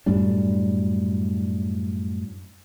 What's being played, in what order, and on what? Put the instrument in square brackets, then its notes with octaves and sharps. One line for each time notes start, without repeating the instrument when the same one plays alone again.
[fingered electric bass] F#2 A2 G3 D4